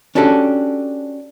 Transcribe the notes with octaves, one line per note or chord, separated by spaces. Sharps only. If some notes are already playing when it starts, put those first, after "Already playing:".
C#4 D4 F#4 G4 A4